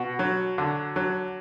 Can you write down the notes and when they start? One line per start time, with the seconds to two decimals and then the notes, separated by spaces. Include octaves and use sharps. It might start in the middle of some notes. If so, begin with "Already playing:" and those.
Already playing: B2 F#4
0.19 F#3
0.58 D3
0.96 F#3